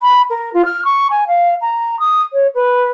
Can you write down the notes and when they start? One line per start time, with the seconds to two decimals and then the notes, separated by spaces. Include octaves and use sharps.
0.01 B5
0.30 A#4
0.53 F4
0.65 F6
0.85 C#6
1.10 G#5
1.27 F5
1.61 A#5
1.99 D#6
2.33 C#5
2.54 B4